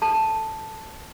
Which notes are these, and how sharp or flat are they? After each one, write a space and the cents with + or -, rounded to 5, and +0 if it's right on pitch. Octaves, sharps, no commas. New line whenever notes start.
A4 +0 A5 +0